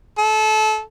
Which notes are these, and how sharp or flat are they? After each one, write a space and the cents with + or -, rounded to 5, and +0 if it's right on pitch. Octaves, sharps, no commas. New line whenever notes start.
A4 -25